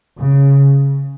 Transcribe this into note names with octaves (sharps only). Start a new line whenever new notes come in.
C#3